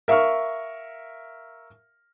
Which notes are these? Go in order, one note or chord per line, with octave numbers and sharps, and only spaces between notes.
A#4 E5 F5 C#6 F6